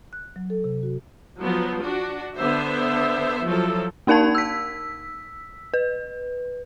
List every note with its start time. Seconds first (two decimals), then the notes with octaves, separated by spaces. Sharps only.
0.13 F#6
0.36 F#3
0.50 A4
0.64 C3
0.83 F#4
1.41 F3 F#3 B3
1.82 D4 F#4
2.36 D3 B3 C5 E5
3.46 F3 F#3 E4 A4
4.07 A#3 D#4 A#4 F5 A5 G#6
4.35 E6 B6
5.74 B4